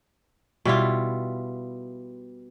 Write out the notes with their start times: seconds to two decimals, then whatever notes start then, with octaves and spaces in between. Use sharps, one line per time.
0.65 B2 G3 E4 F4